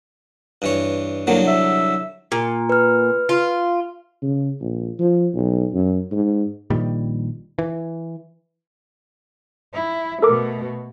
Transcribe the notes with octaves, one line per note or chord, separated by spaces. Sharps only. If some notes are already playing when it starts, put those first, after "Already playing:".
G2 E3 C#5
C2 D3 F#3 A#3
E5
A#2
B4 F6
F4
C#3
A#1
F3
B1
F#2
G#2
A#1 A#2 D#3 G3
E3
E4
B2 A3 A4 A#4 D6